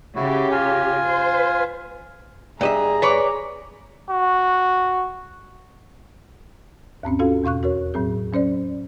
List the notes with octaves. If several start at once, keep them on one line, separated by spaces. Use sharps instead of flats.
C#3 E4 F#4 G4
F4 G#5
C5
G2 G#4 D#5 E5 A#5
B4 C#5 D5
F#4
D#2 G#2 C4 C#4
C#4 F4 F#4 A4 F5
E2 B2 F5 C#6 F#6
F#4 A#4 C#5
A2 F#3 C4 G#4
F#3 C#4 C5 D5